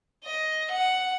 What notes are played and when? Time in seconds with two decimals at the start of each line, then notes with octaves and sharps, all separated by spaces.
0.25 D#5
0.71 F#5